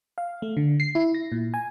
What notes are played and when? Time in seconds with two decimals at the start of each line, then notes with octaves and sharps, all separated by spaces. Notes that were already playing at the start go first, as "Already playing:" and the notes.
0.18 F5
0.42 A3
0.57 D3
0.80 C7
0.95 E4
1.14 A#6
1.32 A#2
1.54 G#5